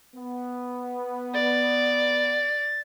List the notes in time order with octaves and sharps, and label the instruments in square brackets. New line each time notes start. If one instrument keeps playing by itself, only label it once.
[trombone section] B3
[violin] D5 [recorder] A6